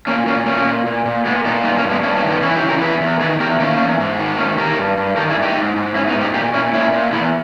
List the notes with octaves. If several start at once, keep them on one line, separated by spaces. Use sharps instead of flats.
A#2 A#3 C#4
A#2 A#3 C#4
A#2 A#3 C#4
A#2
A#2
A#2
A#2 G#3 B3
A#2 B3 D#4
G2 B3 D#4
A#3 C#4
G2
G#3 B3
G2 A#3 C#4
A#3 C#4
D#3
B3 D#4
E3 C#4 E4
D#4 G4
C#3
G4 A#4
E2 G#4 B4
E2
D#3 G#4 B4
E2 G4 A#4
D#3 A#3 C#4
E2
G#2
D#3
G#2 A#3 C#4
D#3 G4 A#4
G2
G2
D#3 G4 A#4
E4 G#4
G2
D#4 G4
G#2
G#2
G#2 C#4 E4
B3 D#4
G#2
D#4 G4
A#2 D#4 G4
A#2 C#4 E4
A#2 C#4 E4
A#2
E2 E4 G#4